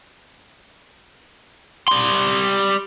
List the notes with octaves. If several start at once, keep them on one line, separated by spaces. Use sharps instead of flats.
G3 C6